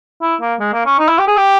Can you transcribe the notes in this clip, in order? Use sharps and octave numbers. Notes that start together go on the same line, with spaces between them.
E4
A#3
G#3
A#3
C#4
D#4
E4
G4
G#4
G4